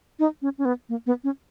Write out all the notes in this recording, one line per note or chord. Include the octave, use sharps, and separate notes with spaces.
D#4
C#4
C#4
B3
A#3
B3
C#4